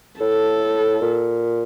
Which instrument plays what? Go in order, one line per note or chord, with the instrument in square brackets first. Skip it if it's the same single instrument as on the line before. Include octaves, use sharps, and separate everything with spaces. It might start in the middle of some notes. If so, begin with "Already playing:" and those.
[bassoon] A2 [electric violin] A4
[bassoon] A#2